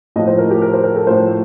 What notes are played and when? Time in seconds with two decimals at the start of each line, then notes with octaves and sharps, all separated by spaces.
0.16 A2 F3 D#5
0.27 C5
0.38 A#4
0.51 G4
0.62 A#4
0.73 C5
0.84 A#4
0.96 A4
1.07 A2 F3 C5